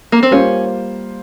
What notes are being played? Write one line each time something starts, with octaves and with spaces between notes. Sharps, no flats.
A#3
C4
G3 A#3 C#4 F4 C5